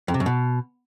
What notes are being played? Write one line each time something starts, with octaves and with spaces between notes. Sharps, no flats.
F2
C3
F#2
B2